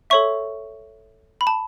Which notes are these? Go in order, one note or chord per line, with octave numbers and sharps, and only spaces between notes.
A4 C#5 E5 C#6
B5
A5